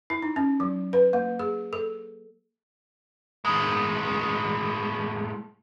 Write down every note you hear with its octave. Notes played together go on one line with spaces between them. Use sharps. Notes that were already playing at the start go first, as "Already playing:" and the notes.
E4
D#4
C#4
F#3
B4
A#3
G#4
A4
A2 G#3